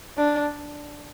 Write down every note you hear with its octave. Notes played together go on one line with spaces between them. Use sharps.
D4